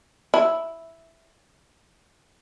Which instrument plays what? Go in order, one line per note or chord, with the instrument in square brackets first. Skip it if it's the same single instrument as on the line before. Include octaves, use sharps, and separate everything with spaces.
[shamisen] E4